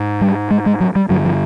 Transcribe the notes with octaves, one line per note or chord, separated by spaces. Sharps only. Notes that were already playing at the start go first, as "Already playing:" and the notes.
Already playing: G#2
G3
G#3
G#3
F#3
G3
G2 D3 F#3
F3